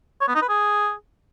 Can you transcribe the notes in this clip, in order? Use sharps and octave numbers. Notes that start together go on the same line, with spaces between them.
C#5
B3
D#4
B4
G#4